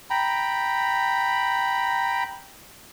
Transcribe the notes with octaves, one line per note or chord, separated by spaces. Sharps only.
G5 A#5 B5